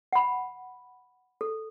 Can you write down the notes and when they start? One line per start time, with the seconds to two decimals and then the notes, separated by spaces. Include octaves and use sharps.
0.13 F#5 B5
1.41 A4